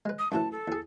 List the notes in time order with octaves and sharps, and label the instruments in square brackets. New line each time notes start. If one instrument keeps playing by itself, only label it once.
[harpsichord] G#3 B4
[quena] D#6
[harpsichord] F#2 A2 E3 [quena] A5
[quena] A4
[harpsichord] E2 G#4